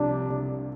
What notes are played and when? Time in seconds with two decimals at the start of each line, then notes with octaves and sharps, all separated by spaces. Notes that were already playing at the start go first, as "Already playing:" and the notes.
Already playing: C2 C3 F3 D4
0.29 C3